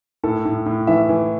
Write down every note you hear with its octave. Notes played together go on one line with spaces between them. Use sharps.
A2 A4
A2
A2
E3 E5
E3